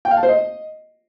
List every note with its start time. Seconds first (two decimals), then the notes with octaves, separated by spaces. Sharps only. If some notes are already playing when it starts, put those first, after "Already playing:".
0.05 G5
0.11 F5
0.17 A5
0.23 C5
0.29 D#5